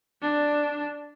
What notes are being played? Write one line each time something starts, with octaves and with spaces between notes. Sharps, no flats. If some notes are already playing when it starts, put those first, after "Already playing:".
D4